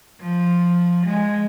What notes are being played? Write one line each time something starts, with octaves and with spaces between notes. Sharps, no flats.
F3
G#3